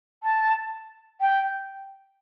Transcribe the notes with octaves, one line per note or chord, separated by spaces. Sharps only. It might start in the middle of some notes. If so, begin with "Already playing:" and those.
A5
G5